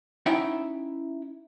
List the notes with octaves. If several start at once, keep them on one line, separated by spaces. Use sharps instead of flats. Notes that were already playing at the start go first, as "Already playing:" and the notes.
C#4 D#4 E4 E5 F#5 G5